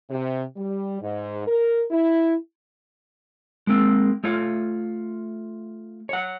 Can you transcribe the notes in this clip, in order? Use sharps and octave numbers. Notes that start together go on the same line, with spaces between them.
C3
G3
G#2
A#4
E4
G#3 A#3 C4
A3 F4 C#5 F5
C#5 F#5